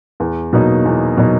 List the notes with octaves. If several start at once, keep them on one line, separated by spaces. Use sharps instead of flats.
E2
B2 F#3 A#3 D#4
E2
B2 F#3 A#3 D#4